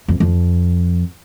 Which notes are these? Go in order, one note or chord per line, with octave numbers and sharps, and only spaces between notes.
F2
F2